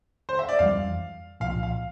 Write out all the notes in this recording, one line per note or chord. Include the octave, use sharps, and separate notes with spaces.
C5
E5
D5
F2 E3 G3 F5
C2 A#2 F3 F5
F5